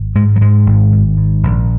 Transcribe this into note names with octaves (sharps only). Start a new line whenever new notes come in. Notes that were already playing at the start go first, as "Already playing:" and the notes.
Already playing: G#1
G#2 G#3
F#3
G#2 G#3
G#1
G#1
G#2
A#1